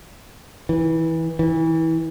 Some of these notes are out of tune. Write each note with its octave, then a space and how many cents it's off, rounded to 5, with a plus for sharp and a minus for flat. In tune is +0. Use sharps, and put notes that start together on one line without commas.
E3 -20
E3 -25